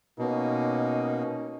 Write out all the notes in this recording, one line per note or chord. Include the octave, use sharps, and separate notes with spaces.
B2 A#3 C#4 D#4